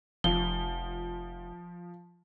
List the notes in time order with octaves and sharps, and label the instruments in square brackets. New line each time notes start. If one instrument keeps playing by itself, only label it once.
[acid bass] F1 [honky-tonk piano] F3 [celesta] G7